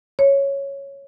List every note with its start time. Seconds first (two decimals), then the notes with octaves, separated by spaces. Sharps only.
0.19 C#5